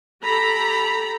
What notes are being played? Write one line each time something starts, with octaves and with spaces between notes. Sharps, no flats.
G4 A4 A#5 B5